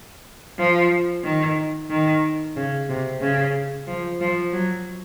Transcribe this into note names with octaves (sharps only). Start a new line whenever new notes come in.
F3
D#3
D#3
C#3
C3
C#3
F3
F3
F#3